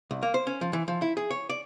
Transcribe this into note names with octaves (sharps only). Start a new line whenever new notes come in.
C2
A#3
C5
C#4
F3
E3
F3
E4
G#4
C#5
D5